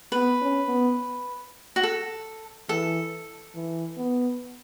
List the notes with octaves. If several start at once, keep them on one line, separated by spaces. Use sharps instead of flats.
B3 B4
C#4
B3
F#4
A4
E3 A4
E3
B3